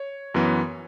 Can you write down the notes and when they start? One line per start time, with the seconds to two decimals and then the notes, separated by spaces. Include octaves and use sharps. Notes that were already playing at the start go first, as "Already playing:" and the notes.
Already playing: C#5
0.34 F#2 E3 B3